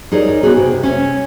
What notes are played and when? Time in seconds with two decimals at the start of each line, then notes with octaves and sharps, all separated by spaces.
0.12 D#4 G#4 A#4 C#5 D5
0.43 B3 F#4 G#4
0.57 C3
0.83 C#4 E5